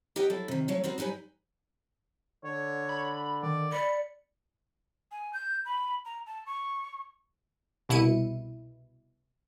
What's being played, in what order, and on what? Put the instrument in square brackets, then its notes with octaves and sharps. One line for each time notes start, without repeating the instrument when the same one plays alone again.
[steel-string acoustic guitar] G4 A#4 D#5 F#5 G5
F#3 E4 A4
C3 D#3
F#3 A3 C#5 F5
B3 C4 F#4 A#4
F#3 G3 D#4 B4 G#5
[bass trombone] D3 [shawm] C#5
[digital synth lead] B5
[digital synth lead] D#3 [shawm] D5
[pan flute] D5 [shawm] B5 [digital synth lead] C#7
[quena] G#5
G6
B5
A#5
A5
C#6
[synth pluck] C2 B2 E4 C#7 D#7